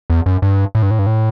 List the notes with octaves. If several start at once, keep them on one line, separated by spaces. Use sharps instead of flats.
E2
F#2
G2
A2
G2
A2
G2
A2